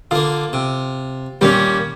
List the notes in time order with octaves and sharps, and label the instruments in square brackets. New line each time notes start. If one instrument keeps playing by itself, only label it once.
[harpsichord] D3 A#3 [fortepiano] F4
[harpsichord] C3
[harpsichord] D#2 A#2 A#3 [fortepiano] G3 C#4